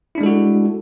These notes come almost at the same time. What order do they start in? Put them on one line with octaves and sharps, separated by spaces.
E4 D4 G#3 A4 F#4